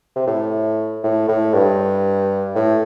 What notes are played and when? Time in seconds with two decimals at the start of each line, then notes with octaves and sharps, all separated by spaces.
0.16 C3
0.27 A2
1.04 A2
1.29 A2
1.54 G2
2.55 A2